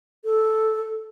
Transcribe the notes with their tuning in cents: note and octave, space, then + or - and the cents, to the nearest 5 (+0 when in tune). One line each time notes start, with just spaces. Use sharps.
A4 -5